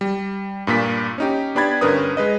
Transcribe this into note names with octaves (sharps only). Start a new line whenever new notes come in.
G3
G2 A#2 A#3 B6
C#4 D#4 G4
B3 D4 G4 B5 G#6 A6
G2 D3 C#4 A#4 B4 D#6
G#3 B4 D#5